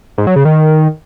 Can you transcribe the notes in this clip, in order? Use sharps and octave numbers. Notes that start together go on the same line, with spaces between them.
G#2
F#3
C#3
D#3